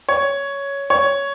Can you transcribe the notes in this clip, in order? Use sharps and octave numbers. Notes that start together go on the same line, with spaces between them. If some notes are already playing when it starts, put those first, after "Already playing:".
C#5
C#5